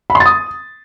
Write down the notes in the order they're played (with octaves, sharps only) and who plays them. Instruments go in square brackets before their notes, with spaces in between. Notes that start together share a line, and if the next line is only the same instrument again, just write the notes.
[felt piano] B5
C6
A6
D#6